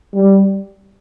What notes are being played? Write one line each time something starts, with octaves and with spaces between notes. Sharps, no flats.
G3